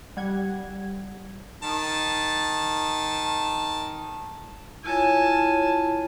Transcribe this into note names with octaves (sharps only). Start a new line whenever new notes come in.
G3 F#5 G#6
D#3 A5
E4 F4 C#5 G#5 A5